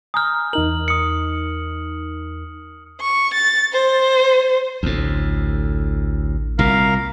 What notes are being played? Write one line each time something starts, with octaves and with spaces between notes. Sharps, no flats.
G#5 A#5 D#6 F6 G6
E2 D#4 A#4 F#7
D#6 C#7
C#6
A6
C5
A1 D2 A2
C2 A#2 A#4 F5